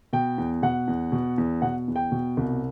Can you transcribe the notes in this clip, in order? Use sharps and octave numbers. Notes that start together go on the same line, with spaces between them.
B2 G5
E2
B2 F#5
E2
B2
E2
B2 F#5
E2
G5
B2
C2